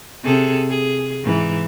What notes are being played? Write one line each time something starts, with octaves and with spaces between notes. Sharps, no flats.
C3 G#4 A4
G#4
G#2 E3